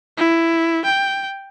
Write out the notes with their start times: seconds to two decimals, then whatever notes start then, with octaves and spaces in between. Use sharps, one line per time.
0.18 E4
0.85 G5